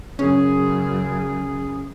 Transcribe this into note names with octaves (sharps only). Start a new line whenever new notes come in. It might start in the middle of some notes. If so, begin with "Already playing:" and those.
F#2 C#3 C#4 G#4